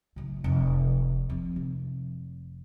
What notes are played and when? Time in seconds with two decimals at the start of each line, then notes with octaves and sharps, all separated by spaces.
0.16 F#1 A2
0.44 F1
1.29 F2
1.56 F1